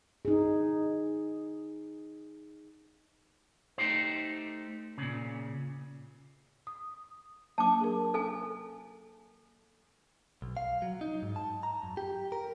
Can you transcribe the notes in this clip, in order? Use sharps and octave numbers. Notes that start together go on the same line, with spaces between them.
D#4 G#4
A3 D#4 G4 C5
A#2 C#3
D#6
F#3 A#3 D4 A5 D6
G#4 A#4
A4 G#5
B1
F5
F#3
D#4
G#2
A5
A#5
F#2
G4
A#4